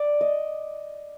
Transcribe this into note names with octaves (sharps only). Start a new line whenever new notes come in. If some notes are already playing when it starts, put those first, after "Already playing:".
Already playing: D5
D#5